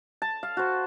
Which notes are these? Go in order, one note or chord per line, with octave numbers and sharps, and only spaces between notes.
A5
F5
F#4 C5